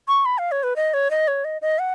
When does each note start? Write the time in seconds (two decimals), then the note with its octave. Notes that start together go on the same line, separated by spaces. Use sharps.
0.08 C#6
0.25 B5
0.38 F5
0.52 C#5
0.63 B4
0.76 D#5
0.94 C#5
1.11 D#5
1.28 C#5
1.45 D#5
1.62 D#5
1.79 F#5